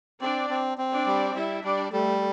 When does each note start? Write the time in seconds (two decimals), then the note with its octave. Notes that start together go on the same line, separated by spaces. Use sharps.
0.21 C4 D4 D5
0.50 C4
0.78 C4
0.92 D4 D5
1.06 G3
1.35 G3 E4 E5
1.63 G3 D4 D5
1.91 G3 A3 A4